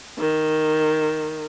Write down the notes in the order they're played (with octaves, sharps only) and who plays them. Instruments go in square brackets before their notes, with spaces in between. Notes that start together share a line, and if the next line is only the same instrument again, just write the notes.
[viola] D#3